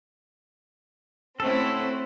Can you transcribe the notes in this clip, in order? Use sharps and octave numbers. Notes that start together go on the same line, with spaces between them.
A3 C4 C#4 E4 F#4 A4